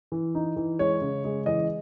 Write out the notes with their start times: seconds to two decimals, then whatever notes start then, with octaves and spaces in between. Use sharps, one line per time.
0.12 E3
0.35 D#4
0.56 E3
0.79 G#3 C#5
1.01 C#3
1.24 G#3
1.46 E3 D#5